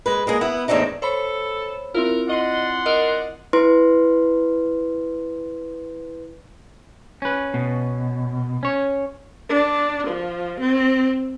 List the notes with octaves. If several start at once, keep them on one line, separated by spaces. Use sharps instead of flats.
G#3 B4
G#3 A#3 G#4
B3 E4 F#5
E2 A2 C4 D4 D#4
A4 C5 C#5 B5
C4 E4 F4 A#4
D5 D#5 F#5 C6
A#4 D#5
E4 B4 C6
C#4 B4
B2
C#4 C#5
D4
F3
C4